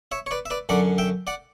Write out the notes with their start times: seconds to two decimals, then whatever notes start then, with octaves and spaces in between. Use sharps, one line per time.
0.12 C#5 E5
0.26 C#5
0.31 B4 D5
0.46 E5
0.50 B4 D5
0.69 F#2 D3 F#3 D5 F#5
0.98 E5 G5
1.27 D5 F#5